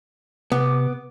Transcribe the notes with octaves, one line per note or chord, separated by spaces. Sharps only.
C3 B3 D6